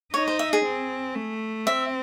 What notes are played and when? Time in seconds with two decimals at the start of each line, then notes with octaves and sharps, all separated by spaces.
0.14 D#4 C#5
0.28 C5
0.39 E5
0.53 G#4
0.64 C4
1.15 A3
1.66 C4 E5